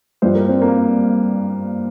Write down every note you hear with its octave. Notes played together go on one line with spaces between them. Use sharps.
G2 F3 C5
A#4
C4
A#3